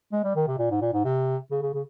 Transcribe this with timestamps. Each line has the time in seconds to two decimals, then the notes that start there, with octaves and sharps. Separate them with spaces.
0.12 G#3
0.24 G3
0.35 D#3
0.47 C3
0.58 A#2
0.71 G#2
0.81 A#2
0.93 G#2
1.05 C3
1.51 C#3
1.62 C#3
1.74 C#3